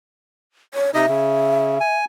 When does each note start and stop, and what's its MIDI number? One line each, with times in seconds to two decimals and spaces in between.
0.74 0.90 73
0.94 1.06 48
0.94 1.06 63
0.94 1.06 75
0.94 1.96 76
1.09 1.78 49
1.80 2.05 80